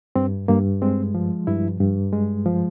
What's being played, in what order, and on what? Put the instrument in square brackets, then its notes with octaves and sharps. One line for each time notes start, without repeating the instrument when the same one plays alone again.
[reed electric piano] G2 C4
G2 A#3
G#3 C4
F3
G2 E4
G2
G#3
F3